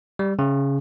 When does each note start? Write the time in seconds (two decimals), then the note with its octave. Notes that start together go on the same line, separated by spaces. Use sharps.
0.19 G3
0.39 C#3